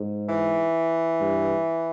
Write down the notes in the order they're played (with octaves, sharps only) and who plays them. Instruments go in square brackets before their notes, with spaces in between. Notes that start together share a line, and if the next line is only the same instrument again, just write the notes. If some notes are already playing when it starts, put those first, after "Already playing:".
Already playing: [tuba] G#2
[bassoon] E3
[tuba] G2